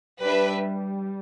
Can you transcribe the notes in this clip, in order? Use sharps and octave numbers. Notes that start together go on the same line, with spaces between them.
G3 D4 G4 B4 E5